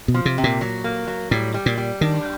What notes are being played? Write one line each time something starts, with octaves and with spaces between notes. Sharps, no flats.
B2
F3
C3
C3
A#2
F#3
A#3
F#3
A2 G3
G3
A#2
G3
D#3 D4